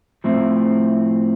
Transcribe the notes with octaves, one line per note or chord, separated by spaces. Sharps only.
A2 F3 C4 E4